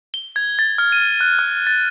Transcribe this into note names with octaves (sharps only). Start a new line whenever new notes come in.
G7
G#6
A6
F6
D#7
F#6
F6
A6